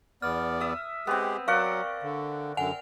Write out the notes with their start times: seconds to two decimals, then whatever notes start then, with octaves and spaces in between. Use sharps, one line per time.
0.22 E2 B3 D5 F6
0.60 E5 D#6
1.07 G#3 B3 C4 G4 G#4
1.48 F#3 A#4 D5 F5 F#5 C#6
2.03 D3
2.57 F#2 D3 F#5 G#5 F7